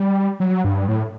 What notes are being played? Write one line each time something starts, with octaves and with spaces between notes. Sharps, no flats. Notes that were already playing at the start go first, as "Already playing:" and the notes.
Already playing: G3
F#3
G2
A2